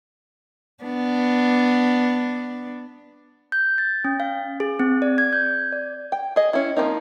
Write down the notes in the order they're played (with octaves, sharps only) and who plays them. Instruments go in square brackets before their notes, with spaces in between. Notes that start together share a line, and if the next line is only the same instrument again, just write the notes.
[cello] B3 D4
[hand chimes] G6
A6
C#4
F5
G#4
C4
D5
G#6
G6
D5
[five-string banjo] G5
G#4 D#5
C#4 E4
F3 G3 A#3 C4 D#4